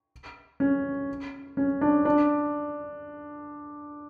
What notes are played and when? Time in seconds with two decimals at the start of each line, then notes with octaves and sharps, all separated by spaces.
0.60 C#4
1.57 C#4
1.81 D4
2.05 D4